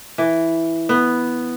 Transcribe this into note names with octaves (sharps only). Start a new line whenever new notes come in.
E3
B3